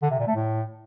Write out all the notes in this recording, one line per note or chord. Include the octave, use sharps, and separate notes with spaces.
D3
C3
A#2
A3
A2